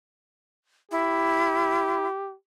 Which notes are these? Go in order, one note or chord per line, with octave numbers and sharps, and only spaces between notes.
E4 G4